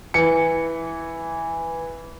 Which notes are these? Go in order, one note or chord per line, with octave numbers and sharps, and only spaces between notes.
E3 C#7